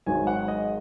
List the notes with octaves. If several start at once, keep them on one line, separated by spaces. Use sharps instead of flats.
G#1 G#2 D#3 F#3 G#5
F#5
D#5